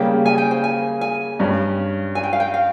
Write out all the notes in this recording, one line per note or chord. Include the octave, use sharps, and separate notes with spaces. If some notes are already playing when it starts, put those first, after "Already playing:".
Already playing: C#3 G3 A#3 C#4 G5
G#5
G5
C5
G#5
G#5
G2 G3 C#4
G#5
G5
F5
G5
F5